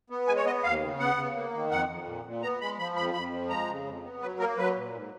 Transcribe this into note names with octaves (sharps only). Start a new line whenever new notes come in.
B3
G#3 G#5
C#5
B3 D#5
D#2 F5
C#3
B3 F#5
C#3
A#3
D#3
F2 F#5
F2
A#2
A#2
B3 A#5
G#3 B5
F3 B5
F2 B5
F2 B5
F3
G#3 A#5
C#3
F2
B3
F#3 B4
A#3 A#4
F#3 B4
A#2
G#2